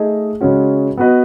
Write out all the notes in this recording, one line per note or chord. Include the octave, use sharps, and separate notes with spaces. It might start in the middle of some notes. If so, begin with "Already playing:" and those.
Already playing: A3 D#4 G#4 D#5
C#3 G#3 C#4 F#4
B3 F#4 B4 D#5